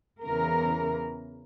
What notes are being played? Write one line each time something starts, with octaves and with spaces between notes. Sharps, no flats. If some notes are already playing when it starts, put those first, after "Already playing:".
E2 C#3 E3 A#4